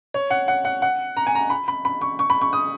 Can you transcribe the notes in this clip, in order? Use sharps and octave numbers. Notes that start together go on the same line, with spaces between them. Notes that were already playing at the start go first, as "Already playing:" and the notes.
C#5
F#5
F#5
F#5
F#5
A#5
G#5
A#5
B5
B5
B5
C#6
C#6
B5
C#6
D#6